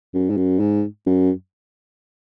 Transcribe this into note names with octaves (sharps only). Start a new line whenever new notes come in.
F#2
G#2
F#2
G#2
F#2